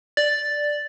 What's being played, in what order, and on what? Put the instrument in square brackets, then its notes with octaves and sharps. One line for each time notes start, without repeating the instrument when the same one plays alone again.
[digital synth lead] D5 [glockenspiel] A6